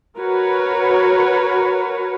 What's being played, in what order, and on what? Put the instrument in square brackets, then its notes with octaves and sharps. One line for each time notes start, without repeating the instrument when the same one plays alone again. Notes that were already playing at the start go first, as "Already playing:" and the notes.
[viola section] F#4 A#4 B4 C#5